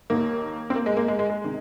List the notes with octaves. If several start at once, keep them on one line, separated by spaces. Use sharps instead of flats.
D#2 D#3 A#3
C4
A#3
G#3
A#3
G#3
G#3
G#3
C3 D#3